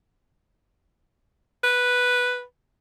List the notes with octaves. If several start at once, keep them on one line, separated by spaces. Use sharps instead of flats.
B4